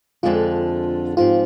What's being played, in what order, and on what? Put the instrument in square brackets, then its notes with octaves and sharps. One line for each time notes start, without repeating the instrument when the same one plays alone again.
[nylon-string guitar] F2 D3 G#3 D4 [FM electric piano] F4
[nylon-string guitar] G#2 F3 C4 G4 [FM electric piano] F4